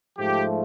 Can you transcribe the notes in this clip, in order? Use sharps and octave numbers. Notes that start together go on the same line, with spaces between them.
G#2 F3 A3 G4